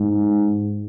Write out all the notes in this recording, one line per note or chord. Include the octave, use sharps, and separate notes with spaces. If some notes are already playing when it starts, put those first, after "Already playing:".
Already playing: G#2